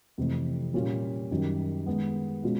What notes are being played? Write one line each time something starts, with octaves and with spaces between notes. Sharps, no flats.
F2 C3 E3 A3 C4
A#2 G3 A#3 C#4 F4
F#2 D#3 G3
D#3 G#3 B3
B2 G#3 C#4 F4